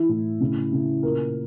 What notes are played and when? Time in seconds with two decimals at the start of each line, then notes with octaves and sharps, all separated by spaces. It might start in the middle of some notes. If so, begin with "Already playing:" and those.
Already playing: E3 E4
0.09 A2
0.40 C#3
0.72 C#3
1.03 A#2 A#4